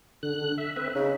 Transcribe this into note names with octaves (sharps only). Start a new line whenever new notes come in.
D3 F#6
E5
C4 B4 E5
C#3 D#4